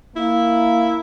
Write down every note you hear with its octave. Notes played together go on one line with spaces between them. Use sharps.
A#3 E4